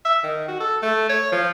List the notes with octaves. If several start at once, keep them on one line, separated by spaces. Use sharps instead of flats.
E5
D#3
F#4
A4
A3
C#5
F3